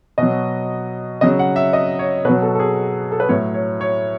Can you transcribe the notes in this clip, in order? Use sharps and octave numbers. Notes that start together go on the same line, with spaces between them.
B2 F#3 D#5
C#3 F#3 D#5
F#5
E5
D#5
C#5
B2 F#3 B4
A4
A4
G#4
A4
B4
A2 F#3 C#5
C#5
C#5